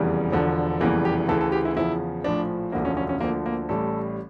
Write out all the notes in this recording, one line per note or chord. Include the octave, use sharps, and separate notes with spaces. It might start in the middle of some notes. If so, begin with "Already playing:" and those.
Already playing: F1 E2 C#3 E3 G3
E1 E2 D3 F3
F1 E2 C#3 E3 G3 A#3
G4
D2 C#3 E3 A4
A4
G4
E4
E2 C#3 F3 E4
A#1 A2 F3 D4
E1 D2 D3 F3 A#3
C#4
C#4
C#4
D2 D3 F3 A#3
A#3
A1 A2 G3 A4